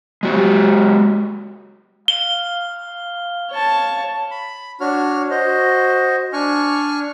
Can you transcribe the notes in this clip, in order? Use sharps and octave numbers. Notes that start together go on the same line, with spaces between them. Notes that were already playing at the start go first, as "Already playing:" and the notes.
G#3 F#4 G4
F5 G7
C#5 A5
B5
D4 F#4 C#5 F6
F#4 C5 D#5
D4 G#5 C#6 F6